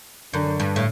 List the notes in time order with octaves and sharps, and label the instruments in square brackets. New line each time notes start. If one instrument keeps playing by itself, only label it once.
[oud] F#2 [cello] D3
[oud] G2
A2